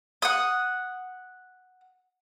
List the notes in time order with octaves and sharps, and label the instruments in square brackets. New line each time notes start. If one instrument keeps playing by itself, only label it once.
[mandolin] F#5 D#6